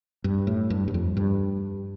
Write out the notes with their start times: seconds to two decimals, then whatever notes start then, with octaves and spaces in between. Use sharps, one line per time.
0.24 G2
0.47 A2
0.70 G2
0.88 G2
0.94 F2
1.17 G2